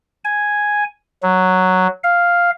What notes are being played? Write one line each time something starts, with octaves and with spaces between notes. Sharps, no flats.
G#5
F#3
F5